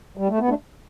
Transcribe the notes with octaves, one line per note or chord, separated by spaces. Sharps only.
G3
A3
B3
A3 D4